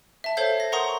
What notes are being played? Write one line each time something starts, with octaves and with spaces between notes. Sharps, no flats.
E5 A5
A4 C5 C#5 F5 G6
A#6
A#4 F#5 A#5 C6 C#6 D#6